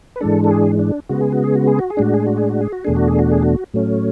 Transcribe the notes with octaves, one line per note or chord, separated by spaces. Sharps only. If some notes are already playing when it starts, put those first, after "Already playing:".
B4
G#2 E3 G#3 D4 A4
A4
G#4
D4
C#3 G#3 B3 F#4
G#4
F#4
G#4
F#4
G#4
F#4
G#4
A2 G#3 D4 F#4
G#4
F#4
G#4
F#4
G#4
F#4
E2 B2 A3 D4 G#4
F#4
G#4
F#4
G#4
F#4
A2 F#3 A3 C#4